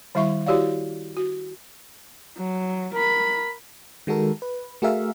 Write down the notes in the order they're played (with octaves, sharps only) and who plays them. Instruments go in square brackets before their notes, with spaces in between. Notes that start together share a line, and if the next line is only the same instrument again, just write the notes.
[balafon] D#3 G3 E4 E5 C#6
E4 F#4 G4 C#5 D5 F5
F#4
[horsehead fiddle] F#3
A#4 B5
[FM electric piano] D#3 G#3 F#4 A4 A#4
B4
A3 F#4 G#4 A#4 E5 F5